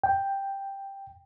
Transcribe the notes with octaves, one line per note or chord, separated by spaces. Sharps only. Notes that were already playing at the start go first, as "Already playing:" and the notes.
G5